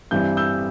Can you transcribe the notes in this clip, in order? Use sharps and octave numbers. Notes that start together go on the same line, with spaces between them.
G2 E3 G3 C4 G6
E6 G6